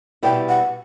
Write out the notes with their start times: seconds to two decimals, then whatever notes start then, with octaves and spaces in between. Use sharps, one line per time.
0.23 B2 G3 B3 E4 G5
0.49 F#5